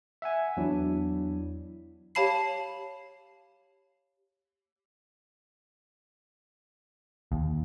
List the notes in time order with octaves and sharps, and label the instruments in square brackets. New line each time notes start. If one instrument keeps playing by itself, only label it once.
[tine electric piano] E5 F#5 G#5
E2 F#3 D4 E4
[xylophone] G4 C#5 F5 A5 B5 C7
[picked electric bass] D#2